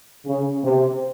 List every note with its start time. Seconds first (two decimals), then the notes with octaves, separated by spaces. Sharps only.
0.25 C#3
0.63 C3